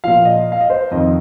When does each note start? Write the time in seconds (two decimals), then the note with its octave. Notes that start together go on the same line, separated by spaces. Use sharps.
0.04 A#2 F3 F5
0.25 D#5
0.52 F5
0.61 D#5
0.70 C5
0.91 F2 D#3 D#5